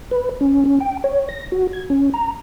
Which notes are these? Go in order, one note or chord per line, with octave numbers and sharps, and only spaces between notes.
B4
C#4
C#4
G5
C#5
A#6
F#4
G#6
C#4
A#5